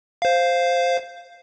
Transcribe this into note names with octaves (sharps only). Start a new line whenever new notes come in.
C5 F5